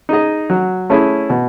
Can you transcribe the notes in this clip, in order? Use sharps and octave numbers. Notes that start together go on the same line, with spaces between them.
D#4 G#4 D#5
F#3
A3 C#4 E4 G#4
B2